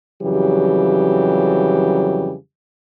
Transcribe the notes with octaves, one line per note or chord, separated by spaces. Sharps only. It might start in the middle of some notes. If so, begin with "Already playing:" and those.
F2 C#3 E3 F#3 G3 G4